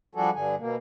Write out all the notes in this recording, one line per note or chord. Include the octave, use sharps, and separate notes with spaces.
F3 G3 D4 F#4 G#4 A4
G2 D3 G#4
B2 A#3